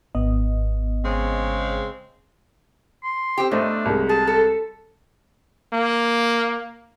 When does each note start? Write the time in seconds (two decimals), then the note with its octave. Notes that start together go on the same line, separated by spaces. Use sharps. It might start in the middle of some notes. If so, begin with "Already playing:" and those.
0.15 G#1 B3 D#5
1.05 C#3 G#3 C4
3.04 C6
3.38 C4 G4
3.51 E2 A3 D4 C5 D#5
3.85 C2 G#3
4.09 G#4 A5
4.27 A4
5.73 A#3